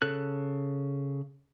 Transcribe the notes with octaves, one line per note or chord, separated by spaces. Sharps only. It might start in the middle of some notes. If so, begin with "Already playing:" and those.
C#3 A4 F#6